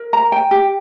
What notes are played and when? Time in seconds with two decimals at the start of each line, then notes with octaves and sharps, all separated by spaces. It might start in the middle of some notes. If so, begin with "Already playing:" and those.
Already playing: A#4
0.13 A#5
0.32 G5
0.51 G4